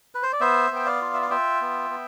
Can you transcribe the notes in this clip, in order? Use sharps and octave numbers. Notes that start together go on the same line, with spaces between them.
B4
C5
D5
B3 C5 E5
B3 G5
D5 F5
F4
E5
F5
F4 E5 G5
B3
B3